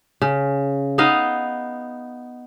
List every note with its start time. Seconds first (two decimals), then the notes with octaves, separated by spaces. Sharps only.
0.22 C#3
0.98 B3 D#4 D#5 F5